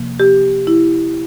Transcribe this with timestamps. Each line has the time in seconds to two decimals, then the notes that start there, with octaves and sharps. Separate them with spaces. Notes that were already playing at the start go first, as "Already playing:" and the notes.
Already playing: C3 F3 A#3
0.19 G4
0.67 E4